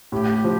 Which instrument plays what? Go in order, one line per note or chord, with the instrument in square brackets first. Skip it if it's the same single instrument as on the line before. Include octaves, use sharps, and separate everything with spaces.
[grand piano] A2 [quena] G4
[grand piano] F3